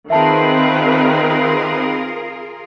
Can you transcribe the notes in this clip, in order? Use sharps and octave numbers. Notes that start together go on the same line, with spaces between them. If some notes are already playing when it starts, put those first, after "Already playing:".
D#3 C4 F4 G#4 A#4 B4 E5 A5